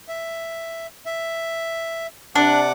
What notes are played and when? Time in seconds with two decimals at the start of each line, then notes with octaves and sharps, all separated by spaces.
0.08 E5
1.06 E5
2.35 C3 D4 F#5 D6